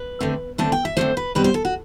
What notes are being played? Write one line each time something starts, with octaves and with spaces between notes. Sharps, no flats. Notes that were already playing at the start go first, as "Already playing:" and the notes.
Already playing: B4
D3 A3 C4
D3 A3 C4 A5
G5
E5
D3 A3 C4 C5
B4
B2 G3 C4 B4
C5
A4
F#4